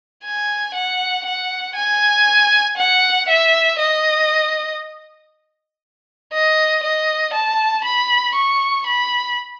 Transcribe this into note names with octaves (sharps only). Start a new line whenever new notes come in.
G#5
F#5
F#5
G#5
F#5
E5
D#5
D#5
D#5
A5
B5
C#6
B5